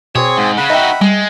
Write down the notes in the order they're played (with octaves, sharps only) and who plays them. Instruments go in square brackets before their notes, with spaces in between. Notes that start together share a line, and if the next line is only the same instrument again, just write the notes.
[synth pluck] B2 [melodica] C4 G#4 [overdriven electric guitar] C#5
[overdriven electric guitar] G#2
[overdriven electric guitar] C#3 [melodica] F#5 B5
[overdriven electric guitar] D#4 F#4 [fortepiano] D#5 E5 G5
[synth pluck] G3 [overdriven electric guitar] G#3